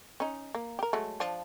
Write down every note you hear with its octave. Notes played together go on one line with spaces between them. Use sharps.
C#4 D#4
A#3
G4 A#4
F#3 G#3 A3
F3 D4